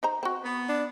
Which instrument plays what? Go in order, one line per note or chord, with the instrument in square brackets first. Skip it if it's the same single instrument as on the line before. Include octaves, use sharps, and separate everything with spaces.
[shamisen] D#4 C5 A#5
C4 F#4
[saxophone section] B3
[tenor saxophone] D4